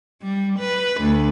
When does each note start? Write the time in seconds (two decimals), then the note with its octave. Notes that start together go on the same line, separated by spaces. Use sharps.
0.23 G3
0.60 B4
1.01 D2